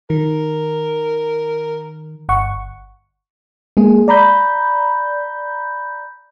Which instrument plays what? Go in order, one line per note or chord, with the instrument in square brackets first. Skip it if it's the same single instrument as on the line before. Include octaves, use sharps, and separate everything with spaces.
[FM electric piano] D#3 [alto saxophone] A#4
[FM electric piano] G1 F#5 C#6
G#3 A#3 G#4
D5 A#5 B5 G6